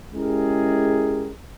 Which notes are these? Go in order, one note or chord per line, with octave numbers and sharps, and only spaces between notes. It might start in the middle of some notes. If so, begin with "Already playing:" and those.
G#3 C#4 E4 G4 G#4 A#4